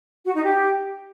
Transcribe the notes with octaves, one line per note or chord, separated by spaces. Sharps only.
F#4
D#4
G4